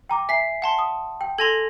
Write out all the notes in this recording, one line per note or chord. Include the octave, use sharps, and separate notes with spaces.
G5 A#5 D6
E5 G#5 B6 C7
F#5 A5 C6
D#6
G5
A4 G#5 C6 G#6 A#6 F7